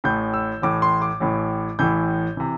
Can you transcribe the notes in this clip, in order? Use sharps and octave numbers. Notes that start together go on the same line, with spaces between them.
A1 A2 E3 G6
E6
A1 A2 E3 D6
C6
D6
A1 A2 E3
A1 A2 E3 G6
C3 E3